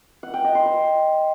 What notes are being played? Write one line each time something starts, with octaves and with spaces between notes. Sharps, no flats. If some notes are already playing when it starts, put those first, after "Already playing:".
F#5
G5
D#5
C6
C5